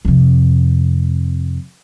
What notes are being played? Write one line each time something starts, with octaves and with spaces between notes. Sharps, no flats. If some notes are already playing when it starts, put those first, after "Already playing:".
F2 C3